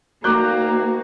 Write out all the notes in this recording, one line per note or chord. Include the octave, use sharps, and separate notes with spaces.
D2 D#3 A#3 F#4 A#5 D6 F#6 G6